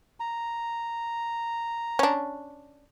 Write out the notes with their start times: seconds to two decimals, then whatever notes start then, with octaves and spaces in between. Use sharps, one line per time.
0.20 A#5
1.99 C#4 D4